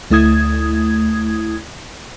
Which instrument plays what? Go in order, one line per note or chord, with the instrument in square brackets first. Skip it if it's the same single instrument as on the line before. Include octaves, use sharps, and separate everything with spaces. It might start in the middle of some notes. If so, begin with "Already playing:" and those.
[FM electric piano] D2 A3 E4 D#6 G#6